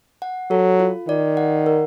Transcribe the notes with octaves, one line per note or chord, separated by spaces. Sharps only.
F#5
F#3 A4
F4
D#3 D5
F#5
A#4